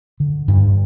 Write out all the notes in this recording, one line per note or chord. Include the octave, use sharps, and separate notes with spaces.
D3
G2